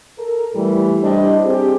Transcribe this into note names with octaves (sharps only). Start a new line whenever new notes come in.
A4 A#4
A2 E3 G3
G3 D4 E4 G4 C5 D#5
C4 G4 G#4